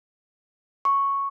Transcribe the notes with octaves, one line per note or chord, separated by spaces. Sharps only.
C#6